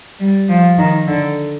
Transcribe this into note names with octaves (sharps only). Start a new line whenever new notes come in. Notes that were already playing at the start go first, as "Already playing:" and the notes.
G3
F3
D#3
D3